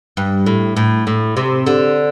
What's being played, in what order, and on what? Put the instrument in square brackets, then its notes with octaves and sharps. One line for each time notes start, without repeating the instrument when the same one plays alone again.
[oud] G2
A2
A2
A2
C3
D3